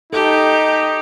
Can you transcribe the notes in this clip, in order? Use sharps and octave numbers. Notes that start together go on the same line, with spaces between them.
D#4 G4 A4